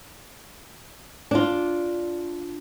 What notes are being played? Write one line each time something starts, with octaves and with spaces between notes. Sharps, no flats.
D4 F4